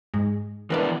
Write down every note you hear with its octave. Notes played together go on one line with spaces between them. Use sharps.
G#2 G#3
E3 B3 D4 A#4 B4 D5